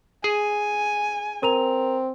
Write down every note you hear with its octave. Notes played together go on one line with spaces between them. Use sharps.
G#4 G#5
C4 A#4 A#5 F7